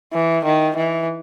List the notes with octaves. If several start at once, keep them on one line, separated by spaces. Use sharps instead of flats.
E3
D#3
E3